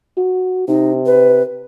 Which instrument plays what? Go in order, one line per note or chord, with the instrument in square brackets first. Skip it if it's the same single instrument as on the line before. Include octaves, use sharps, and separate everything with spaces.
[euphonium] F#4
[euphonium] C3 [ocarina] D#4
[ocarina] B4